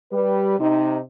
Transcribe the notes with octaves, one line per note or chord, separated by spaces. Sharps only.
G3 B4
C3 D#4